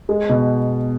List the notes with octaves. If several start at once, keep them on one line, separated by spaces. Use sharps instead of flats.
G#3
B2